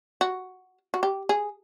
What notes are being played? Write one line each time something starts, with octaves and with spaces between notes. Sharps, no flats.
F#4
F#4
G4
G#4